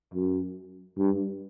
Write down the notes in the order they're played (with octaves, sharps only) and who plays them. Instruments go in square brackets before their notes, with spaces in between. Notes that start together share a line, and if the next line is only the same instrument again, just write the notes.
[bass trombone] F#2
G2